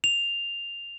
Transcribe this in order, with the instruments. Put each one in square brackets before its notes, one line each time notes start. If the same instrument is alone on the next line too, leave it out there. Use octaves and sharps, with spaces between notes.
[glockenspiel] F7